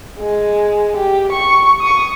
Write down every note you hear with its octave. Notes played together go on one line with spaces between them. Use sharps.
G#3
G4
C#6
C#6 D#6